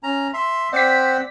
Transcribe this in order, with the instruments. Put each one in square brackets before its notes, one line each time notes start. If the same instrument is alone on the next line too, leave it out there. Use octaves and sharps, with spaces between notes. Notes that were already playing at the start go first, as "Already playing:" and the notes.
[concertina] C#4 A#5
E5 C6
[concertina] C4 C5 F#5 [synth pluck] D5 B6